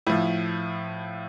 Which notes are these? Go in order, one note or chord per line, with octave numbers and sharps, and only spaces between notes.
A2 F3 E4